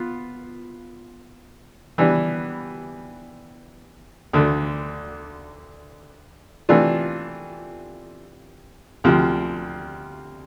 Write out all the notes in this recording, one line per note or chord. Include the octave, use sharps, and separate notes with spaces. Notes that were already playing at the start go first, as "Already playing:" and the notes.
Already playing: B3 F4
E3 G3 B3 D4
D2 D3 A3
C3 E3 A3 D4 F4
D2 C3 F3